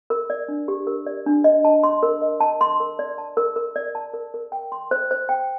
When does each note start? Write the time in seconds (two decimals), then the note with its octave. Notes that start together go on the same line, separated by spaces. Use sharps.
0.10 A#4
0.30 D5
0.48 D4
0.68 G4
0.87 A#4
1.06 D5
1.26 D4
1.44 D#5
1.65 A5
1.83 C6
2.03 A#4
2.22 D#5
2.40 A5
2.61 C6
2.80 A#4
2.99 D5
3.18 A5
3.37 A#4
3.56 A#4
3.76 D5
3.95 A5
4.14 A#4
4.34 A#4
4.52 G5
4.72 C6
4.91 C5
5.11 C5
5.29 G5